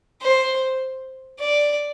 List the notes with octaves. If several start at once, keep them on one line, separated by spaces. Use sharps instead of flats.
C5
D5